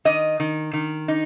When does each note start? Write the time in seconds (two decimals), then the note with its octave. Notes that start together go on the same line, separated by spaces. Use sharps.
0.05 D#3 D#5
0.40 D#3
0.73 D#3
1.08 D#4